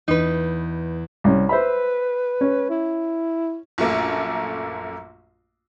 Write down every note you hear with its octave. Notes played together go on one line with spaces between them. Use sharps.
E2 D#4 B4
C2 C#4
B4 C5 E5 B5
C#4
E4
A#1 F#2 A3 A#3